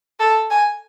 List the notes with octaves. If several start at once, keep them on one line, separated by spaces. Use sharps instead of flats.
A4
G#5